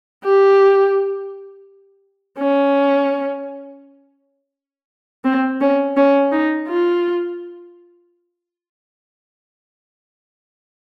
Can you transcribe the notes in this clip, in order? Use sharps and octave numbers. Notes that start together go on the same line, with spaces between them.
G4
C#4
C4
C#4
C#4
D#4
F4